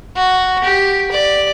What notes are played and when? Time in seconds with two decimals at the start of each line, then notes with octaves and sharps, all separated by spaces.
0.16 F#4
0.64 G4
1.12 D5